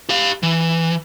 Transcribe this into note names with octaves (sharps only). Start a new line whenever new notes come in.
G4 F5
E3